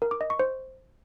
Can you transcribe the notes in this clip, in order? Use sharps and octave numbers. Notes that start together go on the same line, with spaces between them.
A#4
D6
D#5
C#6
C5